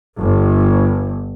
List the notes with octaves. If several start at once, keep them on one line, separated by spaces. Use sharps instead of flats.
G1